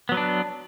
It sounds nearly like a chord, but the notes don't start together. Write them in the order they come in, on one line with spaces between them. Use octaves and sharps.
B3 F#3 B4 D4